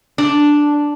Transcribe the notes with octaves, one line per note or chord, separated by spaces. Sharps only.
D4